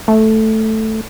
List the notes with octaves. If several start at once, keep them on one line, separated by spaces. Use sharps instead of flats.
A3